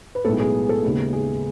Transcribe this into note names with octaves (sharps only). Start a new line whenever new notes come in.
B4
B1 A2 G#3 B3 A4
G#4
A4
D#2 C#3 G#3 B3
G#4